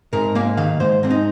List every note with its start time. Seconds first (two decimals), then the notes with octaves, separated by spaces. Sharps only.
0.13 G#2 A#4
0.35 A#3 F5
0.57 D#3 F5
0.80 G#2 C5
1.03 G#2 C4
1.10 D#4